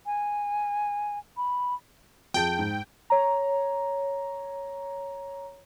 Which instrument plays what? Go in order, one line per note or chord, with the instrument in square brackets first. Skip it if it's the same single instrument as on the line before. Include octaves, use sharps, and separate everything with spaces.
[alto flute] G#5
B5
[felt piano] F2 G#4 A5 [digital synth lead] G5
[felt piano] G#2
[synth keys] C#5 A#5